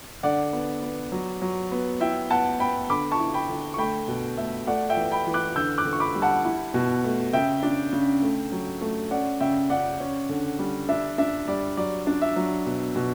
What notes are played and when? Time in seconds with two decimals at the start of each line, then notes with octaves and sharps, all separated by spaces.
0.23 D3 D5 F#5
0.53 B3
0.82 B3
1.12 F#3
1.42 F#3
1.72 B3
2.01 E4 E5 G5
2.30 B3 F#5 A5
2.60 B3 G5 B5
2.90 D3 B5 D6
3.12 A5 C#6
3.19 E4
3.34 G5 B5
3.49 D3
3.74 C#6
3.78 A3 G5 B5
4.08 B2
4.37 A3 E5
4.67 A3 D5 F#5
4.89 E5 G5
4.97 E3
5.11 G5 B5
5.27 E3
5.34 D6 F#6
5.56 D3 E6 G6
5.78 D6 F#6
5.85 D3
5.93 C#6
6.00 B5 D6
6.15 G3
6.22 F#5 A5
6.45 E4
6.74 B2
7.04 A3
7.33 C#3 E5 G5
7.63 D4
7.93 C#3
8.22 A3
8.52 F#3
8.81 A3
9.11 C#4 D5 F#5
9.40 C#3 E5 G5
9.70 C#3 D5 F#5
10.00 C#4
10.29 D3
10.59 G3
10.89 D4 E5
11.18 D4 E5
11.48 G3 D5
11.77 F#3 D5
12.07 D4
12.22 E5
12.36 F#3
12.66 B2
12.96 B2